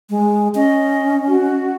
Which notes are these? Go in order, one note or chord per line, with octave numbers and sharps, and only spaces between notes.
G#3
C#4 D#5
F#4